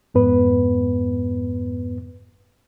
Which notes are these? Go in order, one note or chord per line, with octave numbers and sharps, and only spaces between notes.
F2 G#2 B3 B4